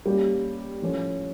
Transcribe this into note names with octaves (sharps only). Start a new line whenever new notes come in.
G3 A#3 C#4 G4
A2 F3 C#4